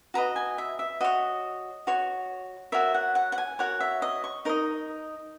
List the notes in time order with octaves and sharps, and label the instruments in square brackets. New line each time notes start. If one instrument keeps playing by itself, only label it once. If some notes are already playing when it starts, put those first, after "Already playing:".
[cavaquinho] F#4 B4 D#5 A#5
G#5
E5
E5
F#4 C#5 D#5
F#4 C#5
F#4 A#4 C#5 E5
F#5
F#5
F#5
G#5
F#4 A#4 C#5 F#5
E5
D#5
C#6
D#4 A#4 D#5